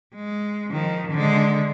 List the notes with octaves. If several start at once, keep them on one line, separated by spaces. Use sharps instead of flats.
G#3
D#3 F3
D3 G#3